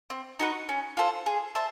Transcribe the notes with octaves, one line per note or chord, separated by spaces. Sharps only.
C4
D#4 F#4 B4
C#4
F4 A4 C5
G#4
C5 E5 A5